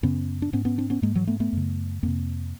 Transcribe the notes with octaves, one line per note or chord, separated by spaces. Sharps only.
F#2 C#3 B3 C#4
D4
G#2 B3 C#4
B3 C#4
C4 D4
B3 C#4
G#2 G#3 A#3
E3 F#3
A3 B3
A3 B3
F#2 C#3
F2 C3 A#3 C4